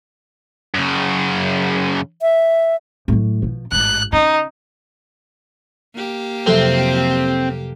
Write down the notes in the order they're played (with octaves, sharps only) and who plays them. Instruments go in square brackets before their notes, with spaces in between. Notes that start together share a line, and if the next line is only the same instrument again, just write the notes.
[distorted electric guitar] F#2 C#3
[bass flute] E5
[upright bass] A2 F#3
B2 F3
[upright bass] A1 G#2 [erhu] F#6
[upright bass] C#3 [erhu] D#4
[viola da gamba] A#3 G4
[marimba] F2 C3 E5 [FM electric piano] F3 F#3 A4 [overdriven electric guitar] C4